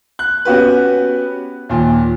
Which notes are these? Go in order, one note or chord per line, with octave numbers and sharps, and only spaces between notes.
F#6
B3 C#4 F#4 G4 B4
D#2 A#2